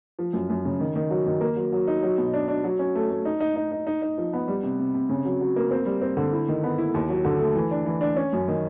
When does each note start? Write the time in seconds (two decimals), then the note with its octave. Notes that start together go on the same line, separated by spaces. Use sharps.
0.19 F3
0.33 F#2
0.50 F#2
0.65 C#3
0.80 D#3
0.95 D#3
1.10 F#3
1.26 D#3
1.41 A#3
1.56 F#3
1.73 F#3
1.87 D#4
2.03 F#3
2.18 B2
2.33 D4
2.48 D4
2.64 F#3
2.79 C#4
2.95 A3
3.10 A3
3.25 D#4
3.40 D#4
3.56 D#4
3.72 D#4
3.87 D#4
4.02 D#4
4.18 F3
4.33 B3
4.48 G3
4.63 C3
4.79 C3
4.94 C3
5.09 C#3
5.25 F#3
5.41 F#3
5.56 A#3
5.71 C4
5.86 G3
6.02 C4
6.17 D3
6.33 E4
6.48 D#3
6.64 B3
6.78 E4
6.94 D#2
7.09 F#3
7.25 D3
7.39 A3
7.55 E3
7.71 D4
7.86 E3
8.01 D4
8.16 C#4
8.33 F#2
8.48 D#3